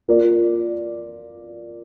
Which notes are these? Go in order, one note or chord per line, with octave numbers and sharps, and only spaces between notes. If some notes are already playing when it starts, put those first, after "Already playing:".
A#3 F4 A#4 D5